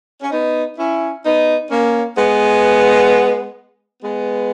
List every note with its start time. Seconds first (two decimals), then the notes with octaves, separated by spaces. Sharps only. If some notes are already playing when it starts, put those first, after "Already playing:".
0.21 C#4
0.31 B3 D#4
0.77 C#4 E4
1.24 B3 D#4
1.70 A#3 C#4
2.17 G#3 B3
4.03 G#3 B3